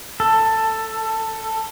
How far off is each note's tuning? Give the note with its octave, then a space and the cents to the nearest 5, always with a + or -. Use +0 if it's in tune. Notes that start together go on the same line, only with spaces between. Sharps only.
A4 +15